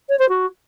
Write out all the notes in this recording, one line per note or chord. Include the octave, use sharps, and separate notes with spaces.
C#5
C5
F#4